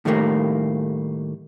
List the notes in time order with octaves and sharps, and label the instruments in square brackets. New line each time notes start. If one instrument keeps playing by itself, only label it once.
[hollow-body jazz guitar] A2 D#3 G3 A3 A#3